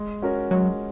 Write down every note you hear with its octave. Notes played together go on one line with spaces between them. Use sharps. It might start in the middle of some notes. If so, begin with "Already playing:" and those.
Already playing: G#3
C#4 F#4 A#4 C#5
F#3 G#3